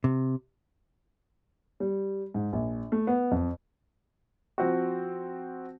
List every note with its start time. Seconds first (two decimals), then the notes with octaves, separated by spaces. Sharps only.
0.04 C3
1.80 G3
2.34 G#2
2.53 A#1
2.92 A3
3.07 B3
3.31 F2
4.58 F3 C4 F#4